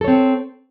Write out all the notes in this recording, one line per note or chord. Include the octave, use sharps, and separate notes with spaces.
C4 A4 C#5